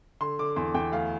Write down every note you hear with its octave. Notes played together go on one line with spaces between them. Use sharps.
D3 C6
D3 D6
E2 C6
E2 G5
D2 F5